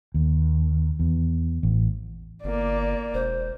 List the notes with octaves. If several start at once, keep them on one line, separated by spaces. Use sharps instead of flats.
D#2
E2
A1
G1 A#3 D5
E1 C5